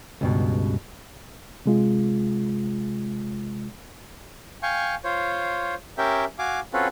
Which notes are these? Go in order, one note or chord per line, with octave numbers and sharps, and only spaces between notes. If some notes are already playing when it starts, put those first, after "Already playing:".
C#2 G2 B2
C3 G#3 F4
F5 G5 G#5 C#6
F4 C5 C#5
C#4 G4 A#4 E5 G5
F#4 F5 G#5 D6
C4 C#4 F4 F#4 A4 B4